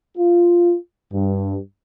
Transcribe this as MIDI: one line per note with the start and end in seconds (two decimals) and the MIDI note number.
0.17 0.75 65
1.12 1.55 43